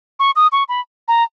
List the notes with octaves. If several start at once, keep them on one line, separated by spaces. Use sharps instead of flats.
C#6
D#6
C#6
B5
A#5